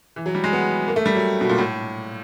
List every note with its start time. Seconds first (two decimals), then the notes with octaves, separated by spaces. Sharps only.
0.16 E3
0.26 F#3
0.35 G3
0.44 G#3
0.53 B3
0.88 A#3
0.96 A3
1.06 G3
1.15 F#3
1.41 B2
1.49 A#2
1.58 A2